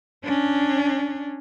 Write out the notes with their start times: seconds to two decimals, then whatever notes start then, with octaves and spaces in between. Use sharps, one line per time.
0.25 C#4 D4